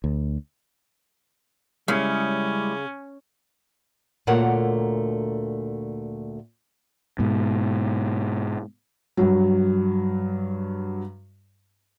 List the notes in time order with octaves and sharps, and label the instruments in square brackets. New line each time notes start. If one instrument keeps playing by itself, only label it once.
[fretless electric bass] D2
[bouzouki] C#3 [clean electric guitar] G3 G#3 E4 [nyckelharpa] C#4
[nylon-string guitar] D2 A#2 A3 A#4 C#5 F#5
[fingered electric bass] G#2 B2
[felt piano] G2 F#3